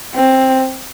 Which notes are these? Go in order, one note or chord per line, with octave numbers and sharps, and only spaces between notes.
C4